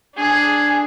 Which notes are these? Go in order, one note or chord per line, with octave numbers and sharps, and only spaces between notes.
D4 G#4